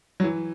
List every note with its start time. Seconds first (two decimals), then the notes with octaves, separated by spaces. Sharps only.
0.20 F#3
0.24 E3